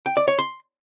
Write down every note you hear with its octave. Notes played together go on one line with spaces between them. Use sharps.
G5
D5
C#5
C6